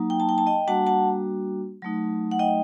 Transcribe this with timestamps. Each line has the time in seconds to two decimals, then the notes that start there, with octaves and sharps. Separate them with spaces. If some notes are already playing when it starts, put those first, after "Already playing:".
Already playing: F#3 A#3 D#4
0.10 G5
0.20 A5
0.29 G5
0.38 A5
0.47 D#5 G5
0.68 G3 A#3 D4 F#4 F#5 A5
0.86 F#5 A5
1.82 F#3 A3 D#4
2.31 F#5
2.39 D#5 G5